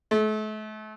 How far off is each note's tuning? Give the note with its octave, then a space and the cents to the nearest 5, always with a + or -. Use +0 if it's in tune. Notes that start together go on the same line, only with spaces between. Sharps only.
A3 -40